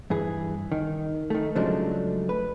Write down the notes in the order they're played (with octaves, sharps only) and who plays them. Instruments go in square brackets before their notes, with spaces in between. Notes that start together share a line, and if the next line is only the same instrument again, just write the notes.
[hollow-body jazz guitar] G2 E3 G#4
D#3
D#3 A3
C#3 F3 F#3 G#3 A3 D4
B4